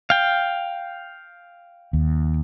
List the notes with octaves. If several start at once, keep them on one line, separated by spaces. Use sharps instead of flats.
F5 G5
D#2